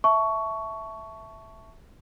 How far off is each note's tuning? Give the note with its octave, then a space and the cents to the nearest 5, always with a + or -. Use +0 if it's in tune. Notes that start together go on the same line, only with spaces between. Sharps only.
E5 +0 A5 +0 C#6 +10